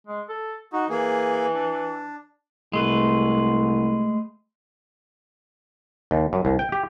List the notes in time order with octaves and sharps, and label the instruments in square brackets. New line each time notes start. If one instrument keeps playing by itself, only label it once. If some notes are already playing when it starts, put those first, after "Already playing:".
[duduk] G#3
A4
[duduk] D#4 [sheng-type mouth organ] F#4
[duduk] E3 [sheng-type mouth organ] A#3 G#4
[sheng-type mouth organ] D4
[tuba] C2 [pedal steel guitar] G#3 A3 B4
[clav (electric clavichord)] D#2
F#2
C2
G5
G4